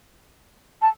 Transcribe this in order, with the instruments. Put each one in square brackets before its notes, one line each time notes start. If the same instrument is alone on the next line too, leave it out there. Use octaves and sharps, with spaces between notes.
[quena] A5